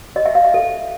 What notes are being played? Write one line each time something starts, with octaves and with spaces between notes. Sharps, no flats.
D#5
E5
F5
E5
A4